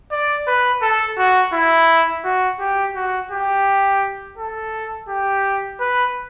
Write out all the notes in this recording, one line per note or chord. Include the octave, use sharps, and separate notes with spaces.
D5
B4
A4
F#4
E4
F#4
G4
F#4
G4
A4
G4
B4